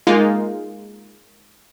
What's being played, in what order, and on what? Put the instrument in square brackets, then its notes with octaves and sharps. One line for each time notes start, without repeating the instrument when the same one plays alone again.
[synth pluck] G#3 A#3 D#4 F4